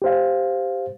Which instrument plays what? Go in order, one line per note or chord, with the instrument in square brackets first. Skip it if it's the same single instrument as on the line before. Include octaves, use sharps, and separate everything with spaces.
[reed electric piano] G4 C5 F5